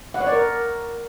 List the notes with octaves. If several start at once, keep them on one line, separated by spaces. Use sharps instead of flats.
F#5
C#5
D5
A#4